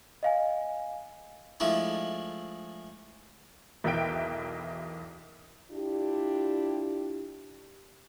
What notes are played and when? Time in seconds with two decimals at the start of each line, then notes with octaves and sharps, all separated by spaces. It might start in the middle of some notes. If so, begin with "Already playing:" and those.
0.23 D#5 F5 G#5
1.60 F3 G#3 A3 D4 E4
3.84 B1 E2 A#4 E5 G5 D7
5.71 D4 E4 F4 G4